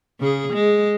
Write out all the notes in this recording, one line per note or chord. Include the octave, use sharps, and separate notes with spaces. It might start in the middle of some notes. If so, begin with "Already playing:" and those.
C#3 G#4
G#3